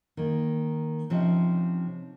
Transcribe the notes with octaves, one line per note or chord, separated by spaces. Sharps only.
D#3 A#3
C3 F3 C#4 D#4